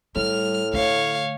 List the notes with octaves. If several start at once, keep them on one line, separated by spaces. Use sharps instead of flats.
A2 G3 F6
D3 A3 C#5 F5